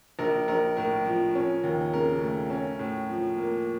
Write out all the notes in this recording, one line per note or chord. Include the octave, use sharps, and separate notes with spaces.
A#1 A#4
A#1 A#4
A2 A#4
F3
C#4
D#2
C#3 A#4
A3
C#4
A2
F3
A#3